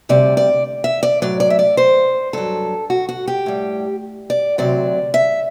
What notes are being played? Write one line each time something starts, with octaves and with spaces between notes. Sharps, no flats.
D2 C3 G3 D5
D5
E5
D5
A2 F#3 D5
D5
E5
D5
C5
G2 F#3 A4
F#4
F#4
G4
A2 G3
D5
D2 C3 F#3 D5
E5